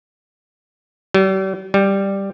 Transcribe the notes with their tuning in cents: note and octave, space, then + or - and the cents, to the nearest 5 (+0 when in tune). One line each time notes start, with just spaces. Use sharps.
G3 -40
G3 +5